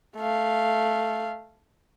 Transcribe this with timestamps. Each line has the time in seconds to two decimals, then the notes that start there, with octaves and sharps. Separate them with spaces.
0.17 A3 F5